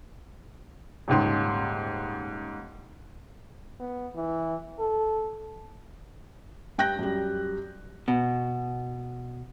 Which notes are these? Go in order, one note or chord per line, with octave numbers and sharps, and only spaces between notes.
D#1 C#2 G#2 C6
B3
E3
A4
G2 G5 F#6 G6 A#6
F#2 G3
B2